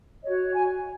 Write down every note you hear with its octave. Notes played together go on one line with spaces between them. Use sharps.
F#4 C#5 D#5
G#5